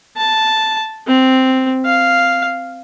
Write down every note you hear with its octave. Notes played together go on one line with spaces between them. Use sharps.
A5
C4
F5